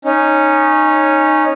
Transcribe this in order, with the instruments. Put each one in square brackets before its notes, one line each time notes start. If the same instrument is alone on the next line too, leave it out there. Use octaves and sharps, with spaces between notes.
[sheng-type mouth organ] C#4 D#4